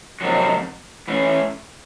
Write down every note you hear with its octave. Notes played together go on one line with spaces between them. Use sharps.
F2 C3 D#3 F#3
E3 A3 C#4 E4